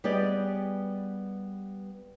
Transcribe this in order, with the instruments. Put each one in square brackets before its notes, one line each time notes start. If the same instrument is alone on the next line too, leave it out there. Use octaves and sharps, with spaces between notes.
[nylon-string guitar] G3 B3 G4 G#4 D5 D#5